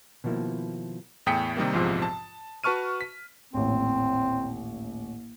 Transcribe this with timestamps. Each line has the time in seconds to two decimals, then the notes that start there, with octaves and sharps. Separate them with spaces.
0.24 B2 D#3 F3 A#3 E4
1.26 E2 A2 G5 D#6 B6 C#7
1.57 C3 D#3 G3 A#3
1.73 A#1 E2 G#2 C3 F3
2.02 A5
2.64 F#4 B4 A5 C#6 F6 D#7
3.01 B6
3.53 D#1 A1 C4